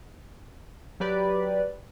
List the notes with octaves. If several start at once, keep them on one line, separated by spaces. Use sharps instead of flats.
F#3 G4 B4 D5